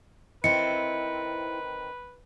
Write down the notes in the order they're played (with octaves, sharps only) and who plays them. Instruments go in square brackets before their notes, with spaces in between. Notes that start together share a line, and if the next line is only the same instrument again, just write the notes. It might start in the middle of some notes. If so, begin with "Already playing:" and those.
[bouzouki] D#3 C4 [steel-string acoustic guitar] E4 C5 [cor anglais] B4 [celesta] C#7